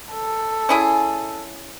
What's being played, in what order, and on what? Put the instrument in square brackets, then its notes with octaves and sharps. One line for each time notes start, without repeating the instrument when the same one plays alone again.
[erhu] A4
[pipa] C#4 E4 G#4